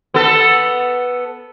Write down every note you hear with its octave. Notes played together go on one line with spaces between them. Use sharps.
B3 A4